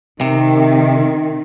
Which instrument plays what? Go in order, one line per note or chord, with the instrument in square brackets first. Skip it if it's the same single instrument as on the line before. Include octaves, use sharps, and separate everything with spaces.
[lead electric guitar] C3 [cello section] D#3